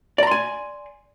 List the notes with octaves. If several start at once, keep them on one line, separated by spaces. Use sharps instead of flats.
D5 G#5 A#5 C6